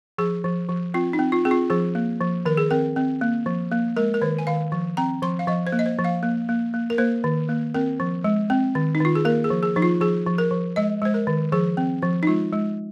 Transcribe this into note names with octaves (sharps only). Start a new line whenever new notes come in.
F3 G#4
F3
F3
C4 F4
D#4
C4
F4
C4 G#4
F4
F3 G#4
A#3
F3
D#3 A#4
G#4
C4 A#4
C4
A#3
F3
A#3
G#3 A#4
A#4
D#3 C5
G#5
D#3 F5
F3
C4 A#5
F3 C6
F5
F3 D#5
C5
A#3
D#5
C5
F3
F5
A#3
A#3
A#3
A#4
A#3 C5
D#3
A#3
C4 A#4
F3
G#3
C4
D#3
D#4
D#3 F4
G#4
A#3 A#4
G#4
F3
G#4
F3 D#4
F4
F3 G#4
F3
A#4
F3
G#3 D#5
G#3 C5
A#4
D#3
F3 G#4
C4
F3
D#4
G#3 F4
G#3